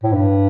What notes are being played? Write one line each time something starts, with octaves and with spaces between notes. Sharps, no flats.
A2
G2